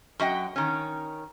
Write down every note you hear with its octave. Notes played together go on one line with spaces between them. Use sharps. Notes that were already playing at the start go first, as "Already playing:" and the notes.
F#2 F#4 D#5 G5
D#3 C#4